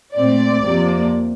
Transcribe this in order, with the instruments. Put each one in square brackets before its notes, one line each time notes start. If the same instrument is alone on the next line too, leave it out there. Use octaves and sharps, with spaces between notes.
[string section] A#2 A3 C4 D5
F2 C3 F3 A#3